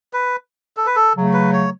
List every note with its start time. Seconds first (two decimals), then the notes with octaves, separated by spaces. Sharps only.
0.13 B4
0.77 A4
0.86 B4
0.96 A4
1.15 C#3 F#3 A3
1.33 B4
1.53 C#5